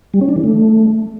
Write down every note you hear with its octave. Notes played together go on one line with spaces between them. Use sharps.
G3
C#4
D4
E3
A3